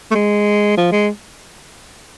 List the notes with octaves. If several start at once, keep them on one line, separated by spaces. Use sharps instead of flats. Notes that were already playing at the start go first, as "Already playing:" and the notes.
A3
G#3
F3
G#3